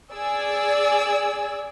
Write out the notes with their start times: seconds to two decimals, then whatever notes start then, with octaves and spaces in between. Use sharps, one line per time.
0.13 G#4 D5 G#5 E6